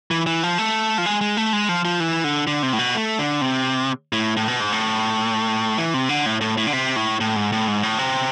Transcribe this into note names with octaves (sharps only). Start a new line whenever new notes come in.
E3
E3
F3
A3
F3
G#3
G#3
A3
G#3
F3
F3
E3
D3
D3
C3
A2
B2
A3
D3
C3
A2
A2
B2
G#2
A2
E3
C3
D3
A2
A2
A2
D3
C3
A2
A2
G#2
A2
G#2
A2
C3